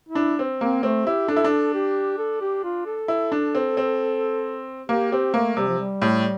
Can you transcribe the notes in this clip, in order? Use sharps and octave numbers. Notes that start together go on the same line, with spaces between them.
E4
D4
C4
A#3 C4
A3 C4
E4 G4
D4 A4
E4
D4
G4
A4
G4
F4
A4
E4
D4
C4
C4
A#3 G4
C4 G4
A3 A#3
C3 G3
F3
G3
A2